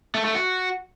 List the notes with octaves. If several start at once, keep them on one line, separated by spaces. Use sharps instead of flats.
A3
A3
F#4